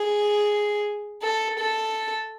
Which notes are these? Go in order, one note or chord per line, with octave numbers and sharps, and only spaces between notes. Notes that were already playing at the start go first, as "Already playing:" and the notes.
Already playing: G#4
A4
A4